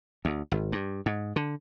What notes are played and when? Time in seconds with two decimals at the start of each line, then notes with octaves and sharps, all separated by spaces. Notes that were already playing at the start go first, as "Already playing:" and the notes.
0.25 D2
0.52 G#1
0.72 G2
1.06 G#2
1.36 D3